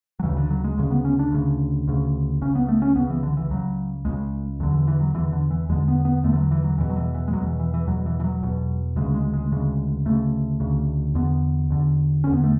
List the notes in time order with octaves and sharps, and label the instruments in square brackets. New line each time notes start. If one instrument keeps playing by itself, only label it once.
[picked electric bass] F#3
D2 C#3 E3
D3
F#3
G#3
D2 C#3 G#3
B3
C#4
D4
D2 C#3
D2 C#3
C#2 C#3 C#4
B3
A3
C#4
C#2 C#3 B3
E3
D3
E3
C#2 C#3 F#3
C#2 C#3 G#3
E2 D3 F#3
E3
E3
F#3
E2 D3 E3
D3
E3
E2 D3 G#3
B3
B3
E2 D3 A3
E3
F#3
E3
F#3
E2 B2 E3
F#3
E3
E3
G#3
E2 B2 F#3
E3
E3
E3
E2 B2 F#3
E3
E3
F#3
E2 B2
D2 C#3 G#3
G#3
G#3
D2 C#3 G#3
D2 C#3 A3
D2 C#3
E2 D3 B3
E2 D3
E2 D3 C#4
B3
A3